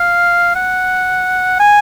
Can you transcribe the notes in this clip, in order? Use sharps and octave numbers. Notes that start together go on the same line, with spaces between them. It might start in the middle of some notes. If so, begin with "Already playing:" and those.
Already playing: F5
F#5
G#5